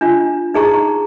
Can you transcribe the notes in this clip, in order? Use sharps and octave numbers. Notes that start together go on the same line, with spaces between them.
D4 F4
D#4 G#4 A#5 C#6